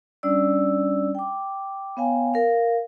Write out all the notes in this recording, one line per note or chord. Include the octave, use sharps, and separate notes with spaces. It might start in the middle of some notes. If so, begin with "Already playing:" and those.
G3 C#4 D4 D5 E6
G5 D6
B3 C#5 F5 G5 G#5
A#4 F5